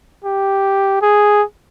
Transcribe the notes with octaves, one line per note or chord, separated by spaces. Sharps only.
G4
G#4